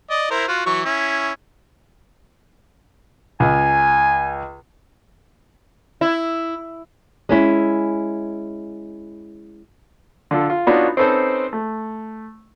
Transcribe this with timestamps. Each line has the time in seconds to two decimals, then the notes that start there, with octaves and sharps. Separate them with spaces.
0.10 D5 D#5
0.31 E4 A#4 C5
0.48 F4 F#4
0.66 E3 F#3 C#6
0.85 C#4 E4
3.40 C#2 G#5
6.01 E4
7.29 G#3 C#4 E4
10.31 D3 F4 A4
10.50 F4
10.67 B3 D4 D#4 F4 F#4 C#5
10.97 C4 C#4 D#4 A4 B4 C5
11.53 A3